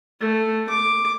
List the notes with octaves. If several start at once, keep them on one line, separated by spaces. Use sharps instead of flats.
A3
D6